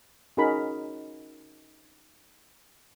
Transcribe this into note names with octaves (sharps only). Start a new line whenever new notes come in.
C#4 D#4 F#4 G#4 A#4 B5